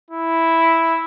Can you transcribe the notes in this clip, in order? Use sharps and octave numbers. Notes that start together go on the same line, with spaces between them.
E4